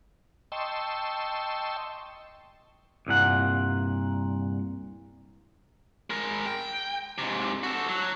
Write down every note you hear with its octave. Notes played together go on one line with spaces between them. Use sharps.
D#5 G5 A5 C6 C#6 E6
C2 G2 A#2 F#5
G#3 A#4
G5
G#2 C3
F#4 A4
F#3